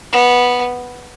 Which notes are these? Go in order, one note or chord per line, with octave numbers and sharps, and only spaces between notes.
B3